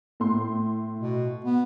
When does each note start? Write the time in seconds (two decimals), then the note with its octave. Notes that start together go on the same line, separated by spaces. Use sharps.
0.20 A2 C6
1.00 B2
1.44 B3